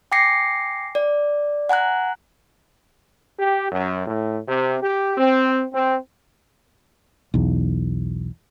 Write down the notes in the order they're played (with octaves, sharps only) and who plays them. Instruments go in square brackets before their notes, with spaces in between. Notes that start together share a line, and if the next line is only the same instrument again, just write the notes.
[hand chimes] G5 G#5 D6 A#6 C7 C#7
D5
F#5 G#5 A#5 F#6
[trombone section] G4
F#2
A2
C3
G4
C4
C4
[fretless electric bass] B1 E2